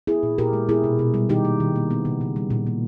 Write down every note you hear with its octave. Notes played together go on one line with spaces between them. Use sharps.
B3 E4 G#4
A#2
A#2 G4 A#4
G#3
B3 E4 G#4
B2
B2
G3
D#3 D#4 G4
A#3
D#3
A#3
B3
C#3
C#3
G3
A#2
A#3